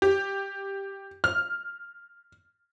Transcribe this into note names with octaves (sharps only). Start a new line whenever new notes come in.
G4
F6